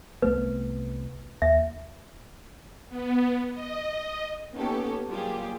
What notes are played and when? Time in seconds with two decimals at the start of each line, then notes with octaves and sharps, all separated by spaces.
0.22 C2 A3 B3 B4
1.42 D#2 E5
2.89 B3
3.53 D#5
4.54 A#3 B3 C#4 D#4 G4 A4
5.08 F#3 G3 A#3 F4 G4 G#4